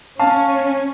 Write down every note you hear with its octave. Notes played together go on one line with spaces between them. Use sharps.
C#4 F5 A5